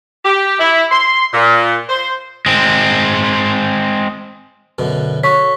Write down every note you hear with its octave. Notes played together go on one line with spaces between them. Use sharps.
G4
E4
C6
A#2
C5
G#3 C4
F#2 B2 D3
F#4 A4 C#5 C#6 B6